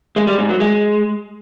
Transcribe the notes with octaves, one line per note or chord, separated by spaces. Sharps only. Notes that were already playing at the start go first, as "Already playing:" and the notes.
G#3
G3
G#2
F#3
G#3